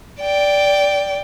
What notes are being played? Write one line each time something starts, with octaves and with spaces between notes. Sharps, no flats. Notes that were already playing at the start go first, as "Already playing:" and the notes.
D5 G5